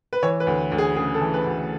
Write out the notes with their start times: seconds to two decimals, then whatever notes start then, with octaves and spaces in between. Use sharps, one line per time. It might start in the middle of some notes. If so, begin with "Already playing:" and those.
0.13 B4
0.23 E3 C#5
0.40 B4
0.47 D2
0.72 D2
0.78 G#4
0.96 C#3 G#4
1.14 A4
1.21 E3
1.34 B4
1.46 D2